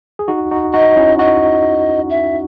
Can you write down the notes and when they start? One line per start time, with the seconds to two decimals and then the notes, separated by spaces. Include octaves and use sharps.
0.19 G#4
0.28 D#4 F#4
0.51 D#4 F#4
0.74 D#4 F#4 D#5
0.96 C#4 E4
1.19 D#4 F#4 D#5
2.10 E5